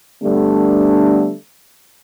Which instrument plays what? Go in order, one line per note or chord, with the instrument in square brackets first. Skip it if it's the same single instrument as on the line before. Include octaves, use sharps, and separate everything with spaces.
[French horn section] D3 G3 A3 B3 D4